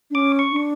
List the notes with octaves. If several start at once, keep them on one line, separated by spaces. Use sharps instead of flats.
D4
C#4 D6
C#6
D4